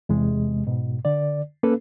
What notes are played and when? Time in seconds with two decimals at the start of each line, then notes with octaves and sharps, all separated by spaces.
0.09 E2 C3 G#3
0.67 G#2 B2
1.05 D3 D5
1.63 A#3 C#4 A4 B4